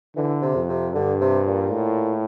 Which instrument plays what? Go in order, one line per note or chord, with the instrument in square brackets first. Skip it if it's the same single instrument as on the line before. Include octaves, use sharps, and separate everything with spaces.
[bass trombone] D3 [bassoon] E3
[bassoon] C3
[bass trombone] F2
[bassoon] C3
[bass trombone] G2 [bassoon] D3
[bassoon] C3
A#2
[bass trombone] A2